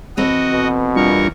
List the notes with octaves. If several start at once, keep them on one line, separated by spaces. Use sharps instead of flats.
E3 C4 F#4 A4 D#5
B2
E2 G3 D4 F4 A#4 C#6